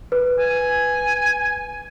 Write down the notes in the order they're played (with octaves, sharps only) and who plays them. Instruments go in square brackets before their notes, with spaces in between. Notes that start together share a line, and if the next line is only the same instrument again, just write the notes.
[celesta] B4
[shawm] G#5